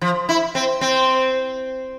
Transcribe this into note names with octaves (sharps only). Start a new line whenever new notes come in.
F3
E4
C4
C4